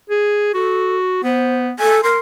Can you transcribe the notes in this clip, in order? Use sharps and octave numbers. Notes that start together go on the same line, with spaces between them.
G#4
F#4 A4
B3 C5
A4 G#5
A#4 C6